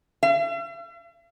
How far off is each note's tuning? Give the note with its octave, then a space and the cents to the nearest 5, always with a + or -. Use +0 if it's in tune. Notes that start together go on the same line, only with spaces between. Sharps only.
E5 +45